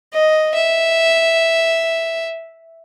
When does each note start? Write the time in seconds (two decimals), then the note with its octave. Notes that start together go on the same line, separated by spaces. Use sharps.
0.13 D#5
0.54 E5